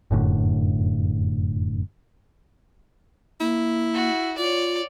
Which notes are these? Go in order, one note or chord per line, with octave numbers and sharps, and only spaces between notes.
F1 F#2 A2 D3
A#3 E4
F#4
F4 C#5 D5